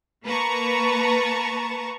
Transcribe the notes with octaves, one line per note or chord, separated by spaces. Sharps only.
A#3 B4 A5 A#5 C#6